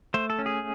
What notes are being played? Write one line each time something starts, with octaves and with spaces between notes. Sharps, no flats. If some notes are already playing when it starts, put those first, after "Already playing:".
A3 C5
A4
C#4
G#4